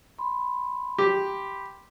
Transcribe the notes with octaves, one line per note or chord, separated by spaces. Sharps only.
B5 C6
G4